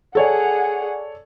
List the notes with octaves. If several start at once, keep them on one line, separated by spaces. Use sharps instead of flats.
G#4 A4 C#5 D5 F#5